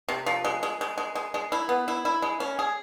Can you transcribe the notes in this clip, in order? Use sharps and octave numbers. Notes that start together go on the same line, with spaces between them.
C3
F3
G#3
G#3
G#3
G#3
G#3
G#3
E4
B3
E4
E4
G#3
C#4
G#4